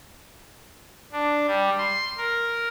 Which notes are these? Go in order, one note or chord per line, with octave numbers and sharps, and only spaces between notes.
D4
G3
C6
A#4